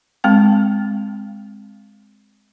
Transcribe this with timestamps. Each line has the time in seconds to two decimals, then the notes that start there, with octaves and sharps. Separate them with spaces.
0.24 G#3 C4 G5